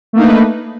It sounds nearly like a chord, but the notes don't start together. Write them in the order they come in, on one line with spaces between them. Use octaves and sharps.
A3 A#3 D#4 D4 B4